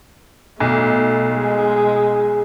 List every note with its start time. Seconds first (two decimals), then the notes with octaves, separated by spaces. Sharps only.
0.60 B1 A3
1.37 G#3